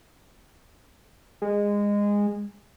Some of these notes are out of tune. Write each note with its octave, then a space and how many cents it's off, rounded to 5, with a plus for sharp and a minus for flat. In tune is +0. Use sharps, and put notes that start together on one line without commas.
G#3 -20